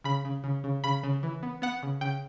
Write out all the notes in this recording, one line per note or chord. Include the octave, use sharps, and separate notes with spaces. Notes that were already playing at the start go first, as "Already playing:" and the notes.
C#3 B5
C#3
C#3
C#3
C#3 B5
C#3
E3
B3
B3 F#5
C#3
C#3 G5